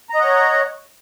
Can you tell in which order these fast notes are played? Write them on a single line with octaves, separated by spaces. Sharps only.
A#5 D#5 F#5 C#5